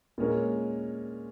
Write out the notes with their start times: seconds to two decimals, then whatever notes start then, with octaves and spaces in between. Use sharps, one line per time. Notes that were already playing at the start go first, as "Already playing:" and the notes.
0.18 A#2 G#3 C#4 A#4